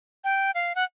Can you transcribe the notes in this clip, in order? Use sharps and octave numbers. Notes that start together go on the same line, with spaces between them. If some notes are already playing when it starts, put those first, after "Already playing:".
G5
F5
F#5